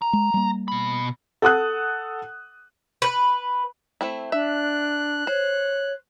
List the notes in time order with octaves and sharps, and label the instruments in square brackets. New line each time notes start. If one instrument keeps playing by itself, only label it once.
[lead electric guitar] A#5
[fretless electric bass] G#3
G3 A#3
[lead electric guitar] B2 B5
[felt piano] A4 F#5 D#6 F#6
[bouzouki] B4
[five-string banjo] A3 C4 E4
[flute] D4 [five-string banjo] E5 [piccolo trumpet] F#6
[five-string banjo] C5 [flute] C#5